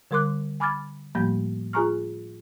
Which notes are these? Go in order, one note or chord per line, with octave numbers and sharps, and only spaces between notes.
D3 G3 A#4 C6 D6 F#6
G#5 B5 D6 F6 G#6 A6
A2 F3 G3 A3 A#3 G6
F4 G#4 G#5 A#5 C#6 F6